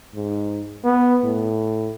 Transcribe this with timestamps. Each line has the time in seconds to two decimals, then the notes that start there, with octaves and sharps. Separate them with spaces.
0.15 G#2
0.84 B3
1.24 A2